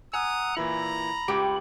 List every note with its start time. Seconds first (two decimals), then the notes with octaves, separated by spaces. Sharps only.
0.14 F#5 G#5 A#5 D#6 E6 F#6
0.57 A#2 E3 E4 A#5 B5
1.28 C#2 G4 D7